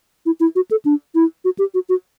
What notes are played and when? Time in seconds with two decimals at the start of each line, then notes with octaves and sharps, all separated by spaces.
0.26 E4
0.40 E4
0.56 F#4
0.71 A4
0.85 D4
1.15 E4
1.45 F#4
1.59 G4
1.74 F#4
1.89 F#4